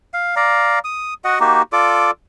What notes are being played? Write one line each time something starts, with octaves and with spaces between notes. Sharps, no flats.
F5
D5 F5 A#5
D#6
F#4 D#5 F#5
A#3 D#4 F#4 G4
F4 A4 D5 D6